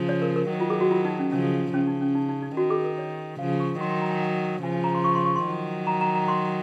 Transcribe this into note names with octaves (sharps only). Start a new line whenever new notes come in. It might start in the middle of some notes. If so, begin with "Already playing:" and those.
Already playing: C#3 F3
C#5
A#4
A#4
D#3 F#3
F4
G#4
F#4
F4
D#4
C#4
C#3 F3 C#4
C#3 C#4
D#4
C#4
D#4
D#4
D#4
D#3 F#4
G#4
A#4
C#5
C#3 F3 F5
C#6
D#3 F#3 C6
C6
A#5
G#5
F#5
C#3 F3 G#5
G#5
A#5
C6
C#6
C6
C#6
C6
D#3 F#3
A#5
A#5
A#5
C6